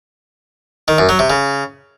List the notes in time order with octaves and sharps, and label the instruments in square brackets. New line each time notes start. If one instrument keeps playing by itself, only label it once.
[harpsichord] D#3
F#2
F#3
C3
C#3